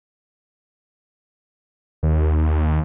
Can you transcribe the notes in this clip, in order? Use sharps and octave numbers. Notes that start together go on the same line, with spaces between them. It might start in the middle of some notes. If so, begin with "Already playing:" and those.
D#2